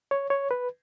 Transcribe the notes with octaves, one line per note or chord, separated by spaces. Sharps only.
C#5
C#5
B4